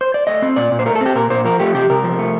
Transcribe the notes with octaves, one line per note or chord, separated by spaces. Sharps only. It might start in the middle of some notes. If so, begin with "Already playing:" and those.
C5
D5
A3 D#5
C4
A#2 D5
A#2
C5
A3 A#4
A4
C4 G4
A#2 A#4
A#2 C5
F3 A#4
A3 G4
C3 G4
C3 A#4
F3
A3